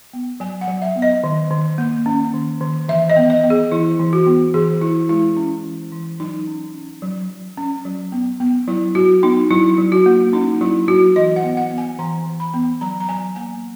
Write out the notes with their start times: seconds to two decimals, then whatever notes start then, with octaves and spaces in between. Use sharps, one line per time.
0.13 B3
0.40 F#3 G#5
0.61 F#5
0.68 F#3
0.82 E5
0.96 B3
1.02 D#5
1.24 D#3
1.51 D#3
1.78 A#3
2.06 C#4
2.33 D#3
2.61 D#3
2.88 E3 E5
3.10 D#5
3.16 B3
3.30 D#5
3.44 B3
3.50 G#4
3.71 E3 E4
3.99 E3
4.13 F#4
4.26 B3
4.54 E3 G#4
4.81 E3 E4
5.09 G#3 E4
5.37 C#4
5.65 E3
5.92 E3
6.20 F#3 D#4
6.47 C#4
6.74 C#4
7.02 F#3
7.29 F#3
7.57 C#4
7.85 F#3
8.12 B3
8.40 B3
8.68 F#3 E4
8.95 F#3 F#4
9.23 B3 D#4
9.51 F#3 E4
9.78 F#3
9.92 F#4
10.06 A#3
10.33 C#4 D#4
10.61 F#3 E4
10.88 F#3 F#4
11.16 E3 D#5
11.36 F#5
11.44 B3
11.57 F#5
11.71 B3
11.78 G#5
11.99 E3 A#5
12.26 E3
12.40 B5
12.54 B3
12.81 F#3 A#5
13.00 A#5
13.09 F#3 G#5
13.36 A#3 G#5